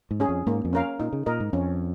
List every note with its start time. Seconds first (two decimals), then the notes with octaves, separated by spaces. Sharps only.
0.11 G#2
0.20 C#4 G#4
0.29 F2
0.47 G#2 A#3
0.65 F2
0.73 C#4 A#4 F5
1.00 A#2 D#4
1.13 C#3
1.26 A#2 A#4 D#5
1.40 G#2
1.53 F2 C#4